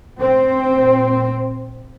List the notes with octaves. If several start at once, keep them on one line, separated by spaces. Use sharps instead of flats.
C4
A#2